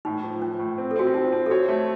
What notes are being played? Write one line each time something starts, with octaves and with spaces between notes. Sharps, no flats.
A2 D#4
F3
F3 C#4
A2
C4
A4
C4 F#4
F4
C4 D#4
F4
C4 D#4
A4
F#4 C#5
A3